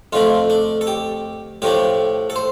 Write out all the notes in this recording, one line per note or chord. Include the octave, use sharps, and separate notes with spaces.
F2 D3 A3 D4 F4
D4
A4
G4
A2 F3 A3 D4 G4
A4
C5